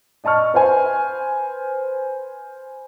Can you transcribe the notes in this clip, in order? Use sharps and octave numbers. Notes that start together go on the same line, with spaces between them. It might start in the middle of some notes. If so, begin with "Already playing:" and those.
D5 D#5 A5 C#6 F6
B4 C5 G#5